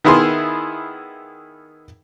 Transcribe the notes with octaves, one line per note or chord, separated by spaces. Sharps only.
D#3 B3 E4 G#4 C6